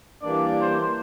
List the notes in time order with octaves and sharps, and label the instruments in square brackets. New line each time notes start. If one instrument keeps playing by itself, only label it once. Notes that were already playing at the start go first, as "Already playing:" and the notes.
[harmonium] E3 G3 A#3 D4 [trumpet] D5
[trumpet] C5